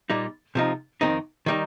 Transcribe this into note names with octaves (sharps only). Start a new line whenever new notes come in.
A#2 G3 D#4
C3 F3 D#4
F2 D#3 C4 D#4
D#3 G3 D#4